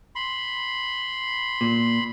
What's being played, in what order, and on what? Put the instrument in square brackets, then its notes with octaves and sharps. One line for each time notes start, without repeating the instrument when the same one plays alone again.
[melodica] B5 C6
[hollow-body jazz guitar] A#2